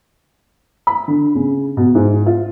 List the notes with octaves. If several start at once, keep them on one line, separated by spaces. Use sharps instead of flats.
B5
D3
C#3
B2
G#2
F4